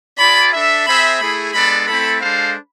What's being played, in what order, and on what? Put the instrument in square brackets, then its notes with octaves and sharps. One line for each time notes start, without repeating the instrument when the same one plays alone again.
[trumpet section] F4 G#4 D5 [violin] B5
[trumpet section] D4 A4 E5
[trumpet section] C4 G#4 C5 E5 [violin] B5
[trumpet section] A3 E4 G#4 [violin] B5
[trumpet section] G#3 B3 D4 A4 D5 [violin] B5
[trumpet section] A3 C4 E4 A4 [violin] B5
[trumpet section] G#3 D4 A4 C5 F5